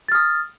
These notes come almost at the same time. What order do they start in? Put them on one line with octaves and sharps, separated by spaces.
A6 F6 D#6